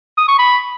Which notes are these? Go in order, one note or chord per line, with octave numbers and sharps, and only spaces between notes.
D#6
C#6
B5